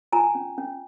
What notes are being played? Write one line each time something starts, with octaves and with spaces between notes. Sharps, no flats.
F4 G#5 A#5
C#4
C#4